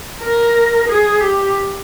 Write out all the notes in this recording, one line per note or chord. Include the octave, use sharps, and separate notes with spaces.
A#4
G#4
G4